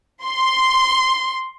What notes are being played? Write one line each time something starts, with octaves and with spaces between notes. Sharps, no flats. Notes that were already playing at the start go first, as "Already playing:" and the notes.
C6